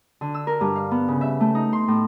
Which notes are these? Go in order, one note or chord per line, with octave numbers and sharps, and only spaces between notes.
D3
E6
A#4
G2
F5
B3
C#3
E5
A3
D#4
C6
A2